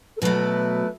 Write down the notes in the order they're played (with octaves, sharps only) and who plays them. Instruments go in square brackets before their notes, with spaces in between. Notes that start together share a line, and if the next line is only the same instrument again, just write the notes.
[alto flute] A4
[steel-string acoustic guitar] B2 F#3 A3 E4 [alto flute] B4